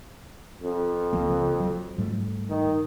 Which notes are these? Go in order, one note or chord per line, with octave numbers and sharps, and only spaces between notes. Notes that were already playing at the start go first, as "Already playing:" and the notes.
F2
C#2 F3 A#3
F#3
G#2 G3 A3
D#3